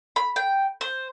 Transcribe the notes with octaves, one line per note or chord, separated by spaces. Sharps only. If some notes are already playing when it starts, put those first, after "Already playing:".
B5
G5
C5